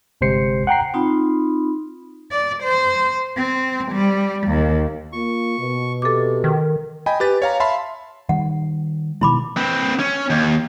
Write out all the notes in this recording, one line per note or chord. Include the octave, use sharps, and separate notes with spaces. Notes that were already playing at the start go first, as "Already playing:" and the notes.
G1 C3 G#3 C5 C7 C#7
F#5 G5 A#5 C7
C4 D#4 F4 B5
D5
C5
C4
G3
D#2
A#3 F4 C#6
B2
C3 A4 D6
D#3
D#5 G5 G#5 B5
G4 B4 A6
C#5 F5 A#5
E5 F5 A5 B5 C6
D#3 G3 F#5
B2 D#3 G#3 E4 B5 D6
C4 B4
C#4
D#2